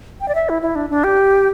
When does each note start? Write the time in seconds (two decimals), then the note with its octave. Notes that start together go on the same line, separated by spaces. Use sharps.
0.21 G5
0.28 D5
0.35 E5
0.49 E4
0.62 E4
0.75 D4
0.90 D4
1.04 G4